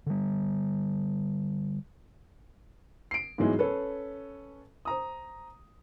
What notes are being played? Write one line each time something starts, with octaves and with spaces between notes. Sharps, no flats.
D3 G3
C7 D7
G#2 E3 F#3 G#3 B3 E4
C#4 A4 B4
C5 A#5 D#6